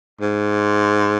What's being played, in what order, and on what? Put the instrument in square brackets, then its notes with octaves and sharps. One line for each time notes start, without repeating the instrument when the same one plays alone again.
[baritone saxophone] G#2